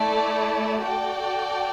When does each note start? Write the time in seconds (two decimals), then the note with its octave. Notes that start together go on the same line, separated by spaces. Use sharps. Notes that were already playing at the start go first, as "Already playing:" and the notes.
Already playing: A3 E4 A4 D5
0.82 F#4 A4 D5 G5